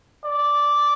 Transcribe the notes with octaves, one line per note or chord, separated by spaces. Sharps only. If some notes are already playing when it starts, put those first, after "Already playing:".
D5